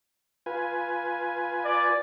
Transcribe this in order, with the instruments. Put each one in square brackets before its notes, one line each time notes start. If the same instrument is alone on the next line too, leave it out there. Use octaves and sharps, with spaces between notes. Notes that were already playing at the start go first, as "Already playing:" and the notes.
[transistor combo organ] F4 B4 G#5
[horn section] D5